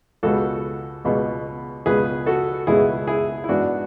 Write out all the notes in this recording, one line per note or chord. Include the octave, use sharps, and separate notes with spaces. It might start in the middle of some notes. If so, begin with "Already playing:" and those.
C#2 B2 G#3 B3 F#4 A4
C#2 B2 G#3 B3
C#2 B2 G#3 B3 G#4 B4
F#4 A4
C#2 B2 G#3 B3 E4 G#4
E4 G#4
E4
G#2 E3 B3 D4 F#4